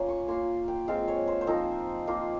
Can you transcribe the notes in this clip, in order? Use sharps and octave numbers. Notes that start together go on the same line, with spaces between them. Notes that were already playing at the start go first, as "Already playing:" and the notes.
Already playing: A#3 C#4 F4 A#5
C#6
A#3 F4 C6
G5
G#3 C4 F4 F5
C#5
C5
C5
F3 C4 D#4 A#4
A#3 F4